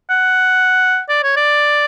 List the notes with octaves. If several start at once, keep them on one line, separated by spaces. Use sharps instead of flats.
F#5
D5
C#5
D5